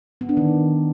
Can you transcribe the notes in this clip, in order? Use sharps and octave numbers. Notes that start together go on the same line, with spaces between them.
B3
D4
D#3